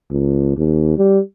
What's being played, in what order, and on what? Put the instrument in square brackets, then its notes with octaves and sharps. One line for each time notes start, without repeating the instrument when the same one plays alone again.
[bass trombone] C#2
D#2
G3